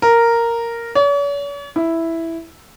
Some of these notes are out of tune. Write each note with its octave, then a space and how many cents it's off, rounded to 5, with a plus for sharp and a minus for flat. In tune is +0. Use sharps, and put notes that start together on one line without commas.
A#4 -5
C#5 +45
E4 +0